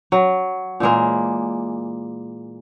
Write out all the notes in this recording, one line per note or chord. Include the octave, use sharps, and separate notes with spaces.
F#3
A#2 E3 G#3 A#3